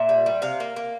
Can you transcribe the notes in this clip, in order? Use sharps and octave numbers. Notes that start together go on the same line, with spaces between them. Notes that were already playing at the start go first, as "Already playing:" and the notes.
Already playing: A#2 E5
G3
G3
C3 F5
A#3
A#3